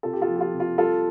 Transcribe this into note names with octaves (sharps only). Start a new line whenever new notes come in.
C3 F4 A4
G4
F4 A4
F3
G4
F4
C3
F4
G3 F4 A4